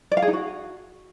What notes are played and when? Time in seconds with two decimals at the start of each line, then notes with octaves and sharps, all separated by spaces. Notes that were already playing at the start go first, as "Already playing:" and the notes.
0.12 D5
0.17 F5
0.22 G#4
0.28 D#4
0.33 F#4